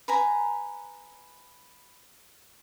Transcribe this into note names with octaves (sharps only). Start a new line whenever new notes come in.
B4 G#5 A#5